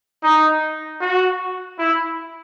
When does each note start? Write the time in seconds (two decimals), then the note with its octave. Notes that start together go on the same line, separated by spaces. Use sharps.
0.23 D#4
1.01 F#4
1.79 E4